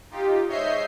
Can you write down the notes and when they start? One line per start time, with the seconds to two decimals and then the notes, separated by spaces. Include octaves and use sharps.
0.11 D#4 F4 G4
0.47 G#2 C#5 D#5 E5 G6 C7